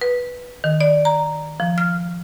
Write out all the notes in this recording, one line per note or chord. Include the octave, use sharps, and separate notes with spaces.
B4
D#3
D5
A#5
F3
F6